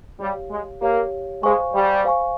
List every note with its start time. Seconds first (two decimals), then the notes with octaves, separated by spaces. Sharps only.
0.20 G3 G4 C#5 F5
0.51 G#3
0.82 A#3 G4 C#5 F5
1.43 G#3 C5 F5 G#5 C#6
1.74 G3
2.05 C5 F5 G#5 C#6